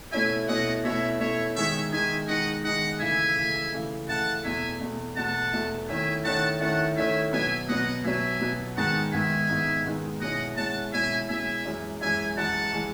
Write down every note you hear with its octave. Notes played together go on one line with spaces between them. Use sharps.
B2 A3 C#4 E4 E5 G#5
B2 A3 C#4 E4 D#5 F#5
B2 A3 C#4 E4 C#5 E5
B2 A3 C#4 E4 C#5 E5
D#3 G#3 D#4 C#5 E5
D#3 G#3 D#4 E5 G#5
D#3 G#3 D#4 D#5 F#5
D#3 G#3 D#4 D#5 F#5
C#3 E3 A3 E5 G#5
C#3 E3 A3
C#3 E3 A3
C#3 E3 A3 F#5 A5
E2 B2 A3 E5 G#5
E2 B2 A3
E2 B2 A3 F#5 A5
E2 B2 A3
D#3 A3 C#4 E4 E5 G#5
D#3 A3 C#4 E4 F#5 A5
D#3 A3 C#4 E4 F#5 A5
D#3 A3 C#4 E4 E5 G#5
B2 F#3 B3 E5 G#5
B2 F#3 B3 D#5 F#5
B2 F#3 B3 E5 G#5
B2 F#3 B3
G#2 D#3 G#3 B3 D#4 F#5 A5
G#2 D#3 G#3 B3 D#4 E5 G#5
G#2 D#3 G#3 B3 D#4
G#2 D#3 G#3 B3 D#4
B2 G#3 C#4 E4 D#5 F#5
B2 G#3 C#4 E4 F#5 A5
B2 G#3 C#4 E4 E5 G#5
B2 G#3 C#4 E4 E5 G#5
F#2 E3 G#3
F#2 E3 G#3 E5 G#5
F#2 E3 G#3 F#5 A5
E3 G#3